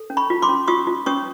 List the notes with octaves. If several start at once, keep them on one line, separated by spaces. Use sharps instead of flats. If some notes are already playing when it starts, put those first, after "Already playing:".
Already playing: A4
C#4
B5 C#6
F4
C6 D6
C#4
F4 C#6 D#6
F4
C#4 C#6 D#6